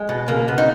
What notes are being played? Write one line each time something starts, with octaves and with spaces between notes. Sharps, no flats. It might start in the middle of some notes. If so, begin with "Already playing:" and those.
Already playing: G#3
B2
C#2 A#3
C#2 B3
D#4